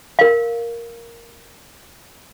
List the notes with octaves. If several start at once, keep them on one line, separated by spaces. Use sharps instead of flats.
A#4 F5